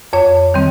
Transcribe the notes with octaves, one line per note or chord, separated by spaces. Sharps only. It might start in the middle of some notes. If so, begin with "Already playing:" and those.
F2 C#5
D#3 G3 C4